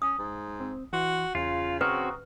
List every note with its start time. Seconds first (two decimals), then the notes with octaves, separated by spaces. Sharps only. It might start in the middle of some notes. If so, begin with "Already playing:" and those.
0.02 C#4 D#6
0.18 G#2
0.60 C4
0.93 E3 F#4 C6
1.35 E2 C#3 F4
1.81 C4 F#4 B4 A#5 C#6 D#6